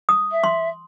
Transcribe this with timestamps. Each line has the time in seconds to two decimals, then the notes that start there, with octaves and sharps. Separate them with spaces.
0.09 D#6
0.32 E5
0.44 C6